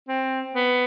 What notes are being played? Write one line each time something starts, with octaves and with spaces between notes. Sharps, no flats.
C4
B3